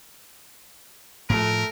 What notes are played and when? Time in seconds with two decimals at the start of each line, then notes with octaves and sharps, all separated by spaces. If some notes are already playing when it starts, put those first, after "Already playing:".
1.30 A2 F3 A3 A#4